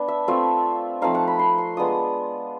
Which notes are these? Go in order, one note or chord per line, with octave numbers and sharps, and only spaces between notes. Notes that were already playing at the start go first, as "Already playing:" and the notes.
Already playing: B3 D4 A5
E5
A3 C4 F4 E5
F3 A3 C4 D#4 F5
F#5
B5
C6
C6
G#3 B3 D4 F4 D#6